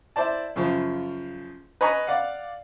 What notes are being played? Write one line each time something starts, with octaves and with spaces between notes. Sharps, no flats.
E4 C5 D5 A5
F#2 C#3 F3
B4 D#5 G#5 A#5 B5 C#6
D5 F5 F#5